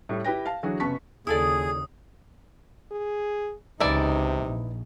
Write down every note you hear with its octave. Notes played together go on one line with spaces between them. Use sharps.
A2 G3 A3
E4 G4 B4 G5 A#6
F5 A5
D3 E3 F#3 F#4 G#4
F1 C#3 B3 A5 C#6 B6
D#2 C#3 E4 G#4 A4 D5 D#6
G#4
C#2 C3 E3 D#4 E4 D5
A#1